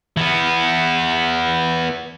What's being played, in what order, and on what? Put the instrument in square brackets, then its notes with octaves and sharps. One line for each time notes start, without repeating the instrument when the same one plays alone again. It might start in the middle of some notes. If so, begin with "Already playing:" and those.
[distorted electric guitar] E3 B3